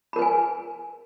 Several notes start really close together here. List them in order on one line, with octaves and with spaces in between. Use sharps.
B5 A#4 B4 G#5